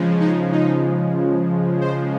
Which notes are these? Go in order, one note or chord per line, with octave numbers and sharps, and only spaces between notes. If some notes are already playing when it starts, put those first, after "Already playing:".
Already playing: C#3 F3 G#3
D#4
D#4
C5